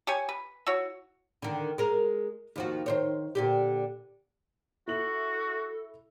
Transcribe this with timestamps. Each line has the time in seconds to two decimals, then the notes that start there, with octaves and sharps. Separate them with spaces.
0.07 G4 C#5 G#5
0.29 B4
0.67 E4 F#4 C#5
1.42 D3 D#3
1.78 G#3 A#4
2.56 D#2 F3 F#4
2.86 D#3 C5 C#5
3.35 A#2 D3 G4
4.88 E4 F#4 A4 F#7